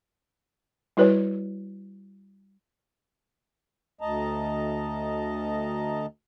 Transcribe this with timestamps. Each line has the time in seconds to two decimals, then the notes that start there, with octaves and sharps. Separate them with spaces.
0.97 G3 E4 F#4 B4 C#5 D5
4.01 D2 D#5 A5 A#5